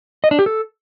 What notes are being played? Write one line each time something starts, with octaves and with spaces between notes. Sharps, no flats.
D#5
D4
G4
A4